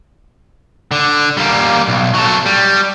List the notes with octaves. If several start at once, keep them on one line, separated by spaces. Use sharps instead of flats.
D3
G3 A#3
B1
F#3 A4
G3